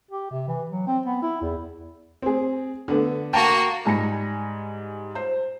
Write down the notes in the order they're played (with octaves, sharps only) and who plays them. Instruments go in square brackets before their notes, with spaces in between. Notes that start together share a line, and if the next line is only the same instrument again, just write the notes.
[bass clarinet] G4
C3
E3
F#3
C4
B3
E4
E2
[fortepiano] C4 G#4
D3 B3
[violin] A#3 F#4 [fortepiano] G5 A5 A#5
[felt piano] G#2 G3 G#5 B5 A#6 C#7
C5